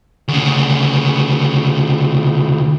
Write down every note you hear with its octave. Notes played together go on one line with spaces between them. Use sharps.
D2 C#3